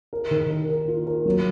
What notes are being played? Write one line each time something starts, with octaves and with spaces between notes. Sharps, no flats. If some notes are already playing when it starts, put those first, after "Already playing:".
A#4
D#3
A#4
A#4
F4
A#4
F#3